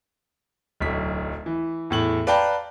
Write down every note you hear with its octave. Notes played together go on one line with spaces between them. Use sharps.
D1 B1 B6
E3
E2 A2 F#7
B4 D5 F5 G5 A5 A#5